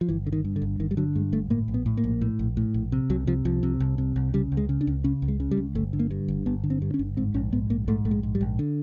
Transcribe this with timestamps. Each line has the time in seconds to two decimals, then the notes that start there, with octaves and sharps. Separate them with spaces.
0.01 F3
0.09 G1 E3
0.27 D3
0.33 D#3
0.45 G2
0.56 D3
0.62 G1
0.80 G1 D#3
0.91 G3
0.97 D3 F#3
1.15 G2 G#3
1.32 G1 A3
1.50 A2 A#3
1.68 A#1
1.74 B3
1.86 A2
1.97 A#3
2.04 A#1
2.21 A2
2.39 A#1
2.57 A2
2.74 A#1
2.92 C3
3.10 C2 F#3
3.27 C3 F3
3.45 C2 F3
3.63 C3
3.80 C2
3.98 C3
4.16 C2
4.34 C#3 G3
4.52 C#2
4.57 G#3
4.69 C#3
4.81 D4
4.87 C#2
5.04 C#3 C#4
5.22 C#2
5.28 G#3
5.40 C#3
5.51 G3
5.57 C#2
5.75 G1 A3
5.93 D3
5.99 A#3
6.11 G2
6.28 G1
6.46 G1 B3
6.64 D3
6.70 C4
6.82 G2
6.94 C#4
6.99 G1
7.17 G#2 C4
7.34 A#1 C#4
7.53 G#2 B3
7.70 A#1 A#3
7.88 G#2 A3
8.05 A#1 A3
8.11 G#3
8.23 G#2
8.35 G3
8.41 A#1
8.59 D3